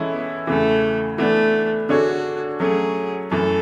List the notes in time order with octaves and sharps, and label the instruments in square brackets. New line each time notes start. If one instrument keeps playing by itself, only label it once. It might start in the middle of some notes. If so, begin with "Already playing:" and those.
Already playing: [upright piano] E3 G#3 C#4 E4 A4
[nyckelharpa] B3
[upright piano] E2 C#3 E3 [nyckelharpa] A3
[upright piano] E3 B3 D4 [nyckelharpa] A3
[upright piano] D3 A3 D4 G#4 C#5 [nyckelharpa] F#4
[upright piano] F#3 A3 C#4 [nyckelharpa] G#4
[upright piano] F#2 E3 A3 [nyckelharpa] A4